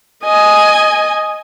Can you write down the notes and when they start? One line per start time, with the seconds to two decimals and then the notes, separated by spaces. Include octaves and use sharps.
0.24 D#5 G#5